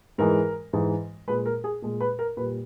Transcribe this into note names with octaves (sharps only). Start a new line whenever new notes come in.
G#2 E3 G#3 A#4
G#2 E3 G#3
A#2 G#3 B4
A#4
G#4
A#2 G#3
B4
A#4
A#2 G3 B4